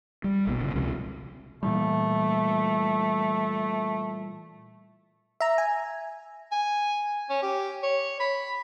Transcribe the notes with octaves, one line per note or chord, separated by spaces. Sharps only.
G3
A#1 B2
G1 C#3
C#2 C3 F3 G#3
A#2 E3 G3 A3
E5 A#5
G#5
G#5
C#4
G4
C#5
B5